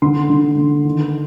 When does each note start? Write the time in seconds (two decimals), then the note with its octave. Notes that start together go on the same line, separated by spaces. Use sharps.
0.02 D3 C6
0.30 D3
0.58 D3
0.85 D#3